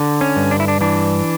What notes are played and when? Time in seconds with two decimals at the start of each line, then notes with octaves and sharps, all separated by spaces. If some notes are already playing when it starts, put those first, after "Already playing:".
Already playing: D3
0.21 C#4
0.36 G2
0.51 D4
0.60 E4
0.68 D4
0.81 E3 D4